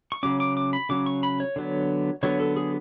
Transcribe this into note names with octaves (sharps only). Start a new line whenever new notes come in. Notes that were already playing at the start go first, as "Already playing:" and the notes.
C#6
C#3 F#3 C#4 D6
D6
D6
B5
C#3 F#3 C#4 D6
C#6
B5
C#5
D3 F#3 B3
D3 F#3 B3 C#5
A4
G#4